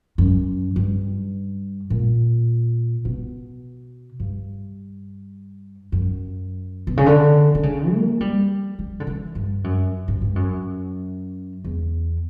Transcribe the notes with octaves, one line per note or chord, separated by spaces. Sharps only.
F#2
G2
A#2
B2
G2
F#2
B2
C#3
D3
D3
C#3
A#3
G3
G3
D3
E3
G2
F#2
G2
G2
F#2
E2